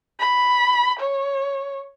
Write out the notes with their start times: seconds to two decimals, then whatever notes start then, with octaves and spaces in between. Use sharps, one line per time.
0.19 B5
1.00 C#5